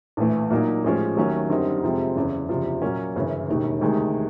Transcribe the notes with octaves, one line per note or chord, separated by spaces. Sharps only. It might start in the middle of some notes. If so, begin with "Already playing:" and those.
A#1 A2 E3 A3
A#2 F#3 A#3 D#4
A1 A2 F3 G#3 C#4
D#2 D#3 F#3 A3 C#4
F#2 D3 G3 C4 D#4
F2 C3 F3 G#3 C4
F#1 E2 C#3
F#1 E2 C3 F3
A#2 F#3 A#3 C#4
G1 F#2 C#3 E3
E1 D#2 D#3
D2 C3 D#3 G#3